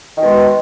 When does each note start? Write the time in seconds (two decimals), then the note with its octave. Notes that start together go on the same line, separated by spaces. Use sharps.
0.16 D#3
0.19 B2
0.23 G#3